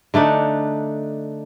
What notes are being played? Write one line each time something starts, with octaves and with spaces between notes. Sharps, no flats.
D3 A3 D4 D#4